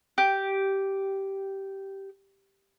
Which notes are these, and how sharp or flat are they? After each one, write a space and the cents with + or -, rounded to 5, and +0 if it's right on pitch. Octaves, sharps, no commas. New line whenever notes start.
G4 -10